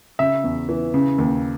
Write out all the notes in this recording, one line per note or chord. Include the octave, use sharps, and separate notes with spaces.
C#3 E5
E2
E3
C#3
D#2